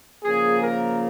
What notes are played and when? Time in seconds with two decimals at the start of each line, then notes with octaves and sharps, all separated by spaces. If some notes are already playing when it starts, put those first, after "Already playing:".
0.23 C#3 F3 A#3 G#4
0.62 A#4